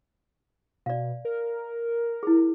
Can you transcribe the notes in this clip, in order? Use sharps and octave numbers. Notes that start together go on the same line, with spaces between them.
B2 D5 F5
A#4
E4 G#4